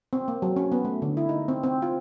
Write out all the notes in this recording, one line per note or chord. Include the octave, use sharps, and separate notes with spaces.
C4
A#3
F#3
C#4
B3
A3
D3
E4
D#4
C4
C4
F4